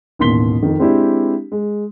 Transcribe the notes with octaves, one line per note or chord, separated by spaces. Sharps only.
A1 D#2 B2 C6 B6 G7
F2 D#3
G#3 C4 D4 E4 G4
G#3